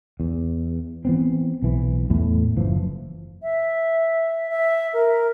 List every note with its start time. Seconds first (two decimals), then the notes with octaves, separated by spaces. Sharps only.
0.20 E2
1.05 E3 B3 C4
1.62 B1 E3
2.10 E2 A2 A3
2.57 F#1 E3 F3
3.42 E5
4.50 E5
4.94 A#4